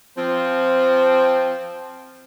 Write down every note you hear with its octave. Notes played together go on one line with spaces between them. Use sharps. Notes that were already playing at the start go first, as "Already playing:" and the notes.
F3 C4